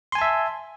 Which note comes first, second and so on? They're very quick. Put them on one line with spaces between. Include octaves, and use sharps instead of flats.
C6 G#5 A5 E5